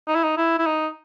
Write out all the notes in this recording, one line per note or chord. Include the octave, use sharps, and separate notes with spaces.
D#4
E4
D#4
E4
E4
D#4